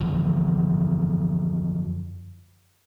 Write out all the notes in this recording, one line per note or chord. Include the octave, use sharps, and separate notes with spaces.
F#2 D3 E3 F3